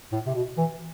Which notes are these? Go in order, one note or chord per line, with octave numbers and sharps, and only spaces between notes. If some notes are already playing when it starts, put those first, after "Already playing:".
A2
C3
B2
E3